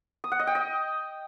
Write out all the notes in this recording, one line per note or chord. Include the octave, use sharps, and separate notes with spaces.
D#6
F#5
D#5
G5
D#5